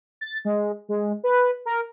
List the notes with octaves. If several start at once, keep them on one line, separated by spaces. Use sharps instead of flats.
A6
G#3
G#3
B4
A#4